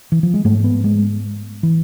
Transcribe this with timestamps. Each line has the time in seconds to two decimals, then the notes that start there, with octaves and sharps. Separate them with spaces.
0.12 E3
0.23 F3
0.34 G#3
0.45 G#2 A3
0.64 B3
0.84 G#3
1.63 E3